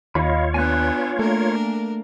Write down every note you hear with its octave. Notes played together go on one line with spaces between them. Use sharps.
D#2 F4 C#5 D#5 F5 B5
B3 D4 G#5 F#6
A3 A#3 D4 A#4